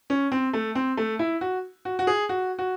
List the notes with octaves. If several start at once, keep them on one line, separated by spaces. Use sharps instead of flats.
C#4
C4
A3
C4
A3
E4
F#4
F#4
F#4
G#4
F#4
F#4